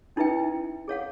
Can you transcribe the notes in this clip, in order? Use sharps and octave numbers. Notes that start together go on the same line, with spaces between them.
C#4 D#4 E4 B4 E5 G5
G#4 C#5 F5 F#5